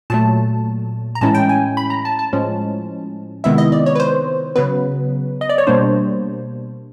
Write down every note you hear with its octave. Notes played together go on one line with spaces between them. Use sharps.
A#2 F#3 A3 A5
A#5
A2 E3 G#3 C#4 E4 A5
G5
G#5
B5
A#5
A5
A5
A2 F3 G#3 C#4
C3 D#3 G#3 B3 E4 E5
D#5
D5
C#5
B4
C5
C#3 F#3 B3 B4
D#5
D5
C#5
B2 G3 A#3 D4 C5